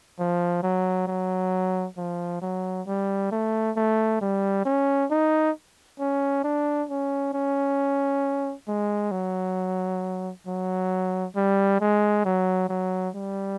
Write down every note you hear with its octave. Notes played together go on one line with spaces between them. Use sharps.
F3
F#3
F#3
F3
F#3
G3
A3
A3
G3
C#4
D#4
C#4
D4
C#4
C#4
G#3
F#3
F#3
G3
G#3
F#3
F#3
G3